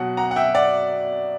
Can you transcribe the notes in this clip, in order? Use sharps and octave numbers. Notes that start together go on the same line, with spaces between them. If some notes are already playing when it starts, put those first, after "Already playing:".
Already playing: B2 F#3 F#5
F#5 A#5
F#5
E5 G5
D5 F#5